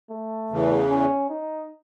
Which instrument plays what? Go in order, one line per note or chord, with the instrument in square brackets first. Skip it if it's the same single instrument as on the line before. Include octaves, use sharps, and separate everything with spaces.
[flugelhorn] A3
[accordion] E2 C#3 E3
[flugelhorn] C#4
D#4